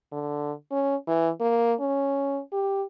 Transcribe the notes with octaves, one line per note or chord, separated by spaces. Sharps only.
D3
C#4
E3
A#3
C#4
G4